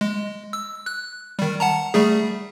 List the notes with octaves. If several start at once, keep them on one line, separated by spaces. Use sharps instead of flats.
G#3
E6
F#6
D#3 G3
F#5 A5 A#5
G3 A3 G#4